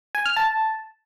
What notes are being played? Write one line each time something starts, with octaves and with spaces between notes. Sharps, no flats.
G#5
F6
A5